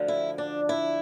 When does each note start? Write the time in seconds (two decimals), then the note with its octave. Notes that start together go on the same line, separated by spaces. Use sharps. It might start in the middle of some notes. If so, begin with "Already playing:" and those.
Already playing: D2 D3 F3
0.08 E4
0.38 D4
0.69 E4